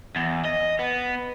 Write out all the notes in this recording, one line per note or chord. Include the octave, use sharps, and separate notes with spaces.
E2
D#5
B3